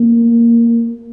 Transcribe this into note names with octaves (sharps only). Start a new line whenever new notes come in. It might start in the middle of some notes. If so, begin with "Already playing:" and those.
Already playing: A#3